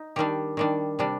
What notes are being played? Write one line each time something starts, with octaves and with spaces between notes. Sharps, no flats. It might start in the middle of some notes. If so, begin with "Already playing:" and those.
Already playing: D#4
D#3 G3 D4 G4
D#3 G3 D4
C3 G3 D4